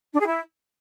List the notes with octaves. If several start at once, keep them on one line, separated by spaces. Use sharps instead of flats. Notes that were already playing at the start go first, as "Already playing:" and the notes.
D4
G#4
E4